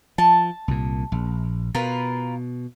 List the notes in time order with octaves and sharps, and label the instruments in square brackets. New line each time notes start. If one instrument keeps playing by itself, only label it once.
[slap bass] F3 [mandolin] A5
[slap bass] C2 A#2
A#1
[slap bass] B2 [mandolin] F4 A#4 B4